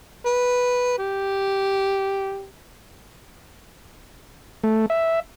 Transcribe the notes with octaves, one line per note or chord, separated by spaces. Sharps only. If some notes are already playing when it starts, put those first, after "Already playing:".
B4
G4
A3
E5